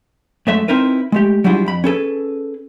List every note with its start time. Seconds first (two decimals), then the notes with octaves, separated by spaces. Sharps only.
0.47 F#2 G#3 A3 A4 E5
0.68 C4 D#4 E4 A#4 B4
1.12 G#3 A3 G4
1.44 F#3 G3 D4 E4 F4 G#4
1.66 F2 B5
1.84 C#4 G#4 A4 B4